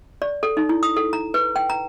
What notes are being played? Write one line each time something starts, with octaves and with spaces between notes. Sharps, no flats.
D5
A4
D#4
E4
D#6
A4
A#5
B4
G5
A#5